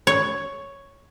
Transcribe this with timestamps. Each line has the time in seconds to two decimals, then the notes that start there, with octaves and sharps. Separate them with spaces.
0.07 C#5